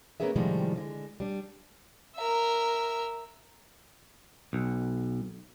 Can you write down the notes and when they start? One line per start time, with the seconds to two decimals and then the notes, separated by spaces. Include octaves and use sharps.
0.20 A#3 B3 C#4 D4 G#4 E5
0.36 A2 C3 D#3 F3 G3 G#3
0.75 D3 G#3
1.20 G3 D4
2.16 A#4 E5
4.53 B1